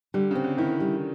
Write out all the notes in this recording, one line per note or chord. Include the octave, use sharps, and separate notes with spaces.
D3 G3
C#3 C4
D3
D#3 E4
G3